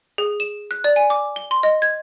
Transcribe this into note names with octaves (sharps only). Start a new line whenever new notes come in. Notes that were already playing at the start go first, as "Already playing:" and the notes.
G#4
E7
F#6
D5
G#5
D6
G7
C6
D#5
G#6